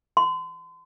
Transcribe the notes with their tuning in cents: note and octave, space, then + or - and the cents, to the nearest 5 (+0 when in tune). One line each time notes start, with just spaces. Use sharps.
C6 -40